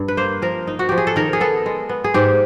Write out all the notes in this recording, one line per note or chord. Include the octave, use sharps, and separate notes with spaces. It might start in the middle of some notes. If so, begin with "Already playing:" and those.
Already playing: G2
B4
A#3 C5
F3 A#4
D#4
F#4
F3 G4
G#4
A4
D#3 A#4
G#4
B3 A4
G#3
B3
G#4
G#2 G4